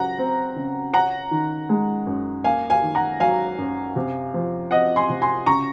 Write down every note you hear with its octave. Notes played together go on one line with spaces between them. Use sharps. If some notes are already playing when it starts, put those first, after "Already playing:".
Already playing: C#3 F#3 F#5 A#5
C4
C#3
C#4 F#5 A#5
D#3
G#3
F#2
A#3 F5 G#5
F5 G#5
D#3
F#5 A#5
F#3 F5 G#5
F#2
C3
F3
C4 D#5 F#5
G#5 C6
C3
G#5 C6
C#3 A#5 C#6